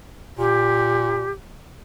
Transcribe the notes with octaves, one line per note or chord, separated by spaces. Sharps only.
A#2 G4